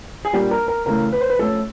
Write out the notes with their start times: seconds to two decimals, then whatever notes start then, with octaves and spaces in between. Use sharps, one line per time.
0.25 G#4
0.33 A#2 G3 A#3 D4 G4
0.51 A#4
0.68 A#4
0.86 C#3 E3 A3 A#4
1.13 B4
1.21 C5
1.30 B4
1.39 F3 A3 C#4 A4